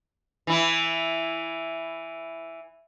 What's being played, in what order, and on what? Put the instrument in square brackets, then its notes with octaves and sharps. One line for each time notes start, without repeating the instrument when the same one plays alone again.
[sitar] E3 E4